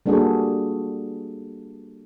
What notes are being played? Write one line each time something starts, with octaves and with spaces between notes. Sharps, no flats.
G3 A#3 D4 F#4 G#4 A4